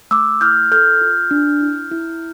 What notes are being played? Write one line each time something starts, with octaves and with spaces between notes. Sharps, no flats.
A3 D6 E6
E4 F6 G6
A4 F6 G6
F4
D4
E4
E4